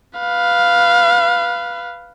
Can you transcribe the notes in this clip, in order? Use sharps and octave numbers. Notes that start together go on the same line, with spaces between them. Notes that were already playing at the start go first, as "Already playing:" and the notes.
B4 F5